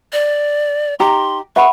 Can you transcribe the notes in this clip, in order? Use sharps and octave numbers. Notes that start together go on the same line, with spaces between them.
D5
D#4 G4 A#5 C6
B4 E5 F#5 B5 C#6